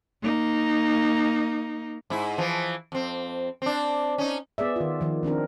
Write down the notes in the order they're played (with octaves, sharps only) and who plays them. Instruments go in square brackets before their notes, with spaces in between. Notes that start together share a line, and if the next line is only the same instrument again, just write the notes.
[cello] A#3 D#4
[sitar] G#2 E4
E3 F3
F2 C4
C4 D4
C#4 D#4
[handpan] B3 G#4 D5 E5
D#3 F4
D#3 F3
D#3 C4 D4 A#4